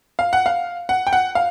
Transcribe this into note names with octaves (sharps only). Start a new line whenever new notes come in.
F5
F#5
F5
F#5
G5
F#5
F5